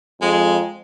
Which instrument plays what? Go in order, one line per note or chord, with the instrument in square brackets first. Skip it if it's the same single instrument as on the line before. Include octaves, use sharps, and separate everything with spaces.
[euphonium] F2 [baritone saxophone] G#3